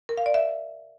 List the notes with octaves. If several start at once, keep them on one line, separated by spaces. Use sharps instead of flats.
A#4
F5
D5
E5